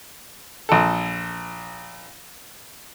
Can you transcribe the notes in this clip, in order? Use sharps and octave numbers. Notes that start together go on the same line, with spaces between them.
A#1 A4